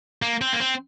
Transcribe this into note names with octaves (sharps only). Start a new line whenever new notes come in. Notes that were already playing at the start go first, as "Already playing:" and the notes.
A#3
C4
A#3
C4